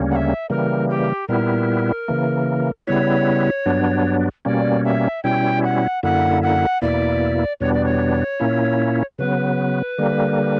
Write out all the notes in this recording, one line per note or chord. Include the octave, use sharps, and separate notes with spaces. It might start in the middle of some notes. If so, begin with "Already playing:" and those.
Already playing: D2 C#3 G3 A#3 C#4
F#5
E5
C#3 E3 G3 A#3 A#4
G4
A#2 G3 B3 E4 A#4
C#3 E3 A#3
C#3 G3 B3 E4 C#5
G2 F#3 B3 D4
B2 G3 A#3 C#4 D5
E5
B2 G3 C#4 E4 G5
F#5
F#2 D3 A#3 E4 F#5
F#5
E2 B2 A#3 E4 D5
E2 B2 G3 B3 D4 C#5
D5
C#5
A#2 A#3 C#4 E4
C#3 F#3 B3 B4
D3 G3 A#3